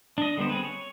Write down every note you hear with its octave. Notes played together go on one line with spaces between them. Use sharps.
D4 D#5
D3 G3 B3 C5
C4 G#4 B4
C#5